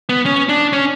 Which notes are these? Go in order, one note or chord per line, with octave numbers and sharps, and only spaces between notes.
B3
C#4
D4
C#4